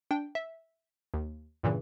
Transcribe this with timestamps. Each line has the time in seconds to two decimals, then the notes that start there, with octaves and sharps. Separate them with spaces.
0.11 D4 G5
0.35 E5
1.14 D#2
1.63 G2 A#2 C#3 E3